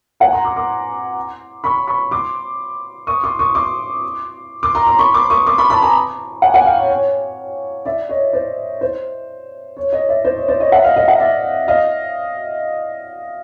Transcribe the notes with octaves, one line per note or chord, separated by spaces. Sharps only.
F#5 G#5
A#5 C6
C6 D6
C6 D6
B5 C#6
B5 C#6
C6 D6
C#6 D#6
C6 D6
C#6 D#6
C6 D6
C6 D6
A#5 C6
A#5 C6
B5 C#6
C6 D6
C#6 D#6
C6 D6
B5 C#6
A5 B5
G#5 A#5
F#5 G#5
F#5 G#5
F5 G5
C#5
C#5
D5 E5
C#5 D#5
C5 D5
C5
C#5
C#5 D#5
D5 E5
C5 D5
C#5
C5 D5
C#5 D#5
E5 F#5
D#5 F5
D#5 F5
E5 F#5
D5 E5
D#5 F5